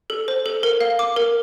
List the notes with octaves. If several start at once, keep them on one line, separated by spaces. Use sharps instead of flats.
A4
C5
A4
A#4
F5
D6
A#4